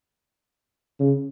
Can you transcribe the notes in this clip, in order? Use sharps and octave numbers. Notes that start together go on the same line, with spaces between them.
C#3